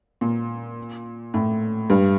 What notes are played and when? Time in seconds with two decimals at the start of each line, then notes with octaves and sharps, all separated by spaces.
0.21 A#2
1.34 A2
1.90 G2